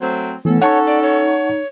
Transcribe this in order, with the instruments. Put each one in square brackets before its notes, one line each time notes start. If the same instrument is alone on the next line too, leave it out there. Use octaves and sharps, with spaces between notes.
[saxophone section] F#3 A3 C4
[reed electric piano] E3 A3 [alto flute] B3 [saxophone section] C#4 A4
[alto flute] D#4 [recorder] C#5 [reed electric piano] F#5 A5 C#6
[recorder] D5
C#5